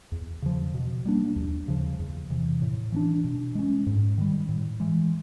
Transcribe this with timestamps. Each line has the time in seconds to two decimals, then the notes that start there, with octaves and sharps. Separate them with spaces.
0.12 E2
0.42 C#3 F3
0.74 B2
1.05 G3 A#3 D4
1.36 D#2
1.68 C#3 F3
1.99 E2
2.30 C3 E3
2.62 A2
2.92 E3 A3 D4
3.24 B2
3.55 G#3 C#4
3.86 G#2
4.18 D#3 G3
4.49 A2
4.80 E3 G#3